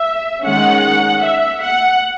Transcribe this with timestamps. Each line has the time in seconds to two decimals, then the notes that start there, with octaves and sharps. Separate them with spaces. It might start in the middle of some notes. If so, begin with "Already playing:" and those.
Already playing: E5
0.43 D#3 G#3 C#4 F#5
1.22 E5
1.61 F#5